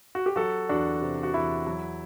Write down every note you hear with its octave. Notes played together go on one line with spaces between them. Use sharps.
F#4
G4
F#3 F#4 A4
E2 D4 F#4
C3
F#4
E2 E4
F#3